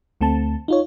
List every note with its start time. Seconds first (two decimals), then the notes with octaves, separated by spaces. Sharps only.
0.21 D2 A3 C4 A5
0.68 D#4 F4 C#5